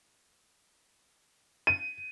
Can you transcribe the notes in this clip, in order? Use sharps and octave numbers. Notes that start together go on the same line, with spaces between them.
D#7